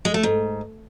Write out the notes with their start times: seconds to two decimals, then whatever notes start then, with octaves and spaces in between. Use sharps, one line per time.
0.05 G#3
0.14 A3
0.23 G#2